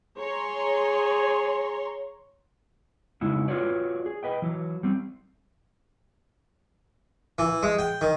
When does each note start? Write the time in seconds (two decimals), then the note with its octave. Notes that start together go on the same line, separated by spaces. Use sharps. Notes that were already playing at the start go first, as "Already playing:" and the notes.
0.18 G#4 C#5 A#5 C6
3.21 C#3 G#3 D#4 E4 F#4
3.48 F4 F#4 B4 C#5 D5
4.06 G#4
4.23 B4 D#5 G5
4.42 E3 F#3
4.83 G3 C4
7.38 E3
7.63 G#3
7.79 G5
8.01 D#3